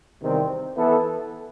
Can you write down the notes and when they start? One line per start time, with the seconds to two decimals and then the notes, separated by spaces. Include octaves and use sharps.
0.21 E2 C3 D#3 G3 C4
0.76 E3 B3 E4 A4